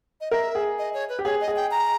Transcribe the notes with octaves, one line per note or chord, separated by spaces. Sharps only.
D#5
A#4 E5
G#4
D#5
C#5
B4
G4
G#4 C#5
D#5
G#4
G5
A#5